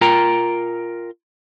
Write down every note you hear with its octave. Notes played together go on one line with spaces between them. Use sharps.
F4 A#4 G5 A#5